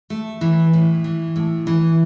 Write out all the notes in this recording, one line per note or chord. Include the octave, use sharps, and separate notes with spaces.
A3
E3
A2
E3
A2
E3